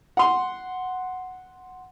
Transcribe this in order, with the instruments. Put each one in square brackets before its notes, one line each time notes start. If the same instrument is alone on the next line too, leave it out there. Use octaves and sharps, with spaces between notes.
[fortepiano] F#5 C6